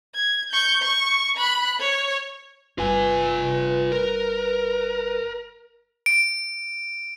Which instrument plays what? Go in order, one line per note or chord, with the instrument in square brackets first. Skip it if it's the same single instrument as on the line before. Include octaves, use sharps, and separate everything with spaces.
[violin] G#6
C#6 G6
C#6
B5 F#6
C#5
[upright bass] G1 G2 [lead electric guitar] F4 G#5 [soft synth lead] B4
[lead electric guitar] A#4
[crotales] D7